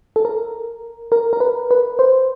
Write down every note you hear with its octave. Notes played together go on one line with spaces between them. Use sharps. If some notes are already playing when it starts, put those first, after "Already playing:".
A4
A#4
A#4
A#4
B4
B4
C5